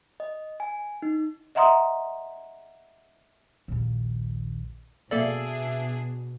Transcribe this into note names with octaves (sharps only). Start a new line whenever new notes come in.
D#5
G#5
D#4
D#5 E5 F#5 A#5 C6 D#6
A#1 D#2
B2 A#3 D4 G#4 A4 D5 E5